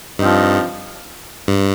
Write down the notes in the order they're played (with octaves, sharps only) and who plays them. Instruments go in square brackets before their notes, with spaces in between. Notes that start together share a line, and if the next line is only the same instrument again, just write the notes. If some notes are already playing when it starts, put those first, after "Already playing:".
[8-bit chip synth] G2 [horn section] F3 C4 D#4
[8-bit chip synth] G2